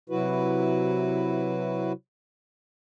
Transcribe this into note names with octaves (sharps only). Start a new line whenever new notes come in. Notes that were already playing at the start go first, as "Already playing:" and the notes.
C3 F#3 E4 F#4 B4